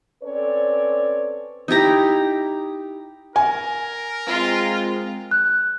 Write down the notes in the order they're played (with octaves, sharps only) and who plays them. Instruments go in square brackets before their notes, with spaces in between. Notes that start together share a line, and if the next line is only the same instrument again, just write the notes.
[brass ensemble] C4 C#4 A4 B4 C#5 D5
[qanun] D#4 E4 G4 A#5
[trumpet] A#4 [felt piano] G#5
[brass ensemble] G#3 C4 [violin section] F4
[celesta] F#6